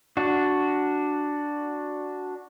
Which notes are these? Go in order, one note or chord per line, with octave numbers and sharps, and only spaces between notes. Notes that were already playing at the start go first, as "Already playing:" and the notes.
D4 F#4